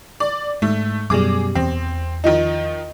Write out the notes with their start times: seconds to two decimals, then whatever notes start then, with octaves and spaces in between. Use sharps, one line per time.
0.20 D5
0.62 G#2 A3
1.10 F#2 B2 G3 G#4 D6
1.55 E2 C4
2.24 D#3 F3 D#4